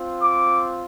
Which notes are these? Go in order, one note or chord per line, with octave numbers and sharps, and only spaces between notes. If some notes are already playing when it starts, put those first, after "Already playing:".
Already playing: C4 F4
D6